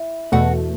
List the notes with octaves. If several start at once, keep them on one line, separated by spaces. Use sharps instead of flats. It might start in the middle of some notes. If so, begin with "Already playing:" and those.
Already playing: E4
E2 B2 A3 F#4